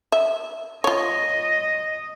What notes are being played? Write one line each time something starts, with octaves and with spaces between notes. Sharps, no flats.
E5
F4 C#5 D#5